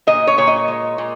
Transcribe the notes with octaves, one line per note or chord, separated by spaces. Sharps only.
A#2 D#5
C#5
A#2 C#5
D#5
G#3
A#2